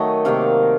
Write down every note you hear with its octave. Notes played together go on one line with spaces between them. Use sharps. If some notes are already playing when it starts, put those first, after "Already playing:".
Already playing: D#3 F#3 A3 D#5
C3 D#3 F#3 A#3 F5